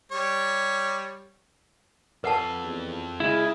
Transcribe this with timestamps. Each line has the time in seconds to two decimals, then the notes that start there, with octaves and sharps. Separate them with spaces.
0.12 G3 C#5
2.24 F2 A4 B4 F#5 A5
2.64 E2
3.20 C#3 G#3 E4